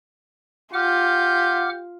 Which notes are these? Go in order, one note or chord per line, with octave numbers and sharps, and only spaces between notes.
F4 G4 F#5 D6 F6